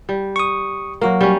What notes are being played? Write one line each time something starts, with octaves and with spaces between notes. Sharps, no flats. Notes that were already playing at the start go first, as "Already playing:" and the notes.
G3
C#6 D#6
F#3 A#3 F#4 A#4
G3 C#4